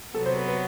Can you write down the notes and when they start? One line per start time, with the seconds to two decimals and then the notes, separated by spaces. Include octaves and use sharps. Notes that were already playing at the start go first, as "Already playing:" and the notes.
0.14 C3 F#3 B3 A4
0.26 C5
0.37 B4
0.48 B4